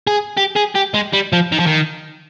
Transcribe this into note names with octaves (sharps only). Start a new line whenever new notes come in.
G#4
G4
G#4
G4
G#3
G3
F3
D#3
F3
D#3